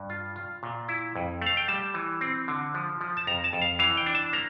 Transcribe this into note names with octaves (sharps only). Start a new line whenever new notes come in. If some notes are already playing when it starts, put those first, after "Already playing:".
Already playing: G2
F4
F4
A#2
E4
F2
A3 F5
G5
G3 A5
E3
C4
D3
F3
F3
A5
F2 A#5
A5
F2
F5
E3 F5
G5
D4
A5
A#3 A#5